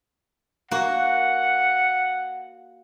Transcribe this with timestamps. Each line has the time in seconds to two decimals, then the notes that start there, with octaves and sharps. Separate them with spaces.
0.71 A#3 F#4 F#5